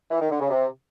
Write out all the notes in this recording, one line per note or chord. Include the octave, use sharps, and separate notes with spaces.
E3
D#3
D3
C#3
C3